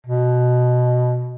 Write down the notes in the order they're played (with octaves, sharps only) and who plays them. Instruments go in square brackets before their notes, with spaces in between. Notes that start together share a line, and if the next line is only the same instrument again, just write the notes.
[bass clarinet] B2